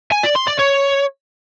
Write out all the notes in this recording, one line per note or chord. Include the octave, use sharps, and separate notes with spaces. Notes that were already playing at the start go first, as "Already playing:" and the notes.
G#5
D5
C6
D5
C#5